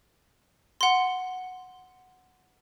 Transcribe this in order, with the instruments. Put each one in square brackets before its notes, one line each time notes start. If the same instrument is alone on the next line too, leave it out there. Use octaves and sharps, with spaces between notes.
[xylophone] F#5 C6